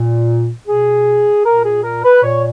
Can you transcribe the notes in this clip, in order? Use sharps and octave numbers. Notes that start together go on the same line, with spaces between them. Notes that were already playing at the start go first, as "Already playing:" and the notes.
Already playing: A#2
B2 G#4
A#2 A#4
G#4
A#4
B4
A#2 C#5